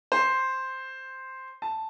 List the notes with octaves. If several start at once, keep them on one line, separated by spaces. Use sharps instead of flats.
C5
A5